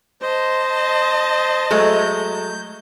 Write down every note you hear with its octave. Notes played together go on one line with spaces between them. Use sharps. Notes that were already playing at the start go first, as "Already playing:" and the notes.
C5 D#5 A5
F#3 G#3 A3 G6